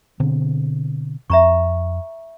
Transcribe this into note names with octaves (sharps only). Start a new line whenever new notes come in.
B2 D3 C4
F2 E5 A#5 C#6